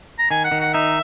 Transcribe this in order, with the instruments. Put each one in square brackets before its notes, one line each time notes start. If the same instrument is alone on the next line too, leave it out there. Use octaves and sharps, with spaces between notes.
[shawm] A#5
[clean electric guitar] D#3 [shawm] G#5
[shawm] F#5
[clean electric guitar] D#3
[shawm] F#5
[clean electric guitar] D#4 [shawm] E5